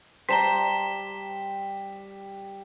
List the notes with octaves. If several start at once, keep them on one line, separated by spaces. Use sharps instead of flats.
G3 C5 A5 A#5 B6 E7 G7